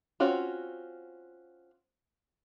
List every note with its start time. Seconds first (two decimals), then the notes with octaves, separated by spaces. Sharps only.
0.20 C4 C#4 F4 F#4